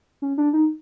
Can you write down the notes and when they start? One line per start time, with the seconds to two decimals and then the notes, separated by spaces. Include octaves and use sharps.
0.22 C#4
0.38 D4
0.53 D#4